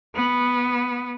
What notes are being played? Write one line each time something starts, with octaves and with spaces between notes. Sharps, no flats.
B3